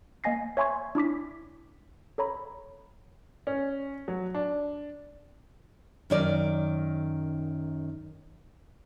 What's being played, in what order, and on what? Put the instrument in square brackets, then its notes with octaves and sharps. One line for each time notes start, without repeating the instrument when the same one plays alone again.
[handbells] A#3 D#5 G#5 A#6 C7
C#5 E5 G#5 C6 C#6 G#6
D4 E4 D6 B6
A4 C#5 A#5 B5
[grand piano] C#4
F#3
D4
[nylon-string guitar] F#2 D#3 D5